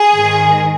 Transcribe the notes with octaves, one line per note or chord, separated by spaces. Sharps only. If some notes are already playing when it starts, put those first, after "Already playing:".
Already playing: G#4
G#2 D#3